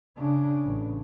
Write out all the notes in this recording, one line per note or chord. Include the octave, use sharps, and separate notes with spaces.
C#3 D4
A1